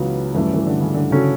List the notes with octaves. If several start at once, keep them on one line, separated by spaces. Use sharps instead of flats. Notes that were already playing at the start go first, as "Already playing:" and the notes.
Already playing: C#2 C#3 E3 F#3 B3
G2 E3 F#3 A3 C#4
E3
D3
C#3
D3
C#3 F#3 C#4 F#4 A4